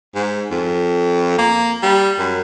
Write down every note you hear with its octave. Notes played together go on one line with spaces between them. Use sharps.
G#2
F2
A#3
G3
F#2